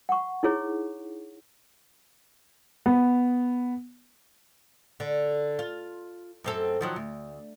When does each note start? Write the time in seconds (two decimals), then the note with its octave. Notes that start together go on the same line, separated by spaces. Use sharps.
0.09 F#5 C#6
0.43 D#4 E4 G#4 C#5
2.86 B3
5.00 D3
5.59 F4
6.44 F#2 C4 A4
6.81 D#3 F3 F#3
6.96 D2